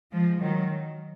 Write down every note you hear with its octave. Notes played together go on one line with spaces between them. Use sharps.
F3 G#3
D#3 F#3